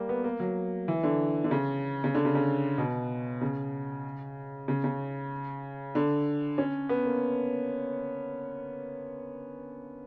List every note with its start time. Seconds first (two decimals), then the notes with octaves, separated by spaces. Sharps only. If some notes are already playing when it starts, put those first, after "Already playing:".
Already playing: G3 A#3
0.09 B3
0.24 A#3
0.40 F#3
0.88 E3
1.03 D3
1.44 D3
1.51 C#3
2.04 C#3
2.15 D3
2.25 C#3
2.35 C#3
2.78 B2
3.41 C#3
4.68 C#3
4.84 C#3
5.95 D3
6.58 C#4
6.89 B3
7.06 A#3